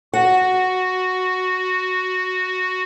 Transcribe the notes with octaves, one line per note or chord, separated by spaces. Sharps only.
F#4 F#5